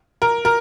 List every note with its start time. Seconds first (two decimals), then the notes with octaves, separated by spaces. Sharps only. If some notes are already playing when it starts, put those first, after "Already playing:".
0.22 A#4
0.45 A#4